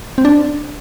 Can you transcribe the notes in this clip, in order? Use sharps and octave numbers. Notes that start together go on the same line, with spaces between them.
C4
D4